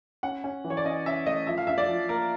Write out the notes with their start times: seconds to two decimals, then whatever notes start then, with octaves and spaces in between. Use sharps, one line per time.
0.23 C#4 F#5
0.44 C#4
0.64 E3
0.70 C#5
0.77 D5
0.85 C#4 D#5
1.06 C#4 E5
1.26 A3 D#5
1.47 F3 E5
1.57 F5
1.67 D4 E5
1.78 D5
1.89 F3
2.09 A#3 A#4